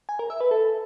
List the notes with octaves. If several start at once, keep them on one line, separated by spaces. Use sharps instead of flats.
G#5
A#4
E5
B4
A4